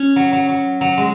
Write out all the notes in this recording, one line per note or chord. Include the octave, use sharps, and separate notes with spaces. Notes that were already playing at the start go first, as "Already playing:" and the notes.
Already playing: C#4
F#3
F#3
F#3
F#3
G#3